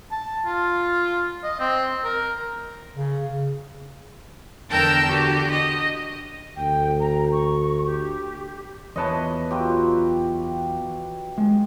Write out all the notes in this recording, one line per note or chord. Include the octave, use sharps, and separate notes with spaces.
A5
F4
D#5
C4
A#4
C#3
E2 D3 A#4 G5 A5 E6
D3 F#4 G4
D#5
D2 G5
A#5
C#6
G4
E2 B4 C#5 D#5 A5
F#3 F4 G4
G#3